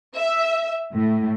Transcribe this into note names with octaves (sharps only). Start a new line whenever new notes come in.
E5
A2